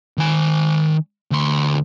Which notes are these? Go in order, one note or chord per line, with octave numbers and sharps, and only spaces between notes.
D#3 G#5
D2 C6